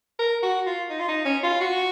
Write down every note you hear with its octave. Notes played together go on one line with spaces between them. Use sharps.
A#4
F#4
F4
D#4
F4
D#4
C#4
F4
F#4